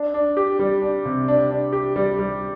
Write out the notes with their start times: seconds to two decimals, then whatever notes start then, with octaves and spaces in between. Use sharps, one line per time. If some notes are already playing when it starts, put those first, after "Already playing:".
Already playing: D4
0.14 D4
0.37 G4
0.59 G3
0.81 D4
1.05 C3
1.28 D4
1.51 D4
1.73 G4
1.96 G3
2.19 G3